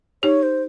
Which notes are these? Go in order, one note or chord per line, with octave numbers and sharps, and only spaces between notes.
D#4 G4 C#5
C5